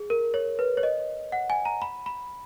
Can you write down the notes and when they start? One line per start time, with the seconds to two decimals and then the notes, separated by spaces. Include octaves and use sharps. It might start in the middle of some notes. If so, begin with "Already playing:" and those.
Already playing: G#4
0.10 A#4
0.34 C#5
0.59 B4
0.77 C#5
0.83 D#5
1.32 F#5
1.50 G#5
1.65 A#5
1.82 B5
2.06 B5